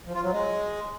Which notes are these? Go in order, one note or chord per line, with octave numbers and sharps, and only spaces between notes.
F3
F4
F#3
G#3